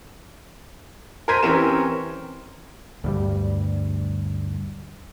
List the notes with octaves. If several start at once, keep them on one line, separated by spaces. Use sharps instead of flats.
A#4 C5 C6 G#6 B6 D#7
E3 C4 C#4 G4 A#4 E7
D2 G2 G3